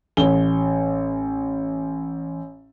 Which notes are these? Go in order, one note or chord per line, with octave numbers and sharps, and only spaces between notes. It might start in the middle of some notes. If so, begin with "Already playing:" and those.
A1 G7